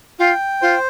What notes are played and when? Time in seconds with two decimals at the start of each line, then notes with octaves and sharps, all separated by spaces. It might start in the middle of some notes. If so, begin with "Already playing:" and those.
0.19 F4 G5
0.62 F4 C5